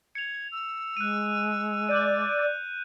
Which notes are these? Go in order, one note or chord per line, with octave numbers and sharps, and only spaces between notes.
G#6 C#7 F7
E6
G#3 F#6 D#7
D5 F#6 G6 D#7